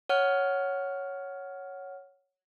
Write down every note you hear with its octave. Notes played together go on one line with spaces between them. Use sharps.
C#5 F#5 F6